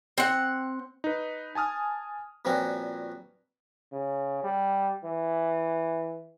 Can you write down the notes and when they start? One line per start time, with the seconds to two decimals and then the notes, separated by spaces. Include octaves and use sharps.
0.18 C4 F#5
1.04 D#4 B4
1.55 G#5 A5 D#6 F6
2.45 G2 A#2 F3 C4 C#4 F#4
3.92 C#3
4.43 G3
5.04 E3